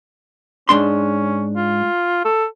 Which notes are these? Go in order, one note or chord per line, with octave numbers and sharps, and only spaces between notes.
G#2 C#4 D4 C6
F4
A4